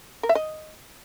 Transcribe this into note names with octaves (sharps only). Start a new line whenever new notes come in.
A#4
E5
D#5